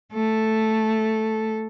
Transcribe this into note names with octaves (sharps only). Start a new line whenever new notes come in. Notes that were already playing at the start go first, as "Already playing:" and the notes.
A3 A4